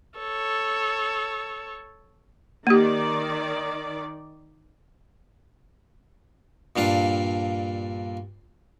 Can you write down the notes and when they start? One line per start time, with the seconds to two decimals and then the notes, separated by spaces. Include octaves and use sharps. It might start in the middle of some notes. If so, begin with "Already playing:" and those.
0.19 A4 C#5
2.67 D#3 A#3 G4 D5
6.76 G2 A#2 D4 F5